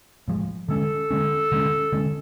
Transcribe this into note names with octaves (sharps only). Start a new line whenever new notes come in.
A2 F3 G#3
D3 G#3 C#4 A4
D3 G#3 C#4
D3 G#3 C#4
D3 G#3 C#4